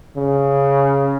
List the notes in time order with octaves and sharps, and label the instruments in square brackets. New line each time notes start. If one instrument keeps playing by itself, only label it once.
[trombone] C#3